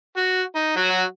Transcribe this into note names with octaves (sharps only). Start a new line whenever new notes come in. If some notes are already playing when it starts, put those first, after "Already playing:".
F#4
D#4
F#3 F#4